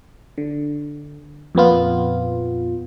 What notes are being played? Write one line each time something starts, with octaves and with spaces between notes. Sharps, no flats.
D3
F2 A#2 B3 F4